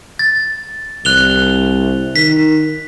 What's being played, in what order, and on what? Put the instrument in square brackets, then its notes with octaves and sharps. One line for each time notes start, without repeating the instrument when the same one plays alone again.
[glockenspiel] A6
[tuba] C2 [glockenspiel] F#6 F7 G7
[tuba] D#3 [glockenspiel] B6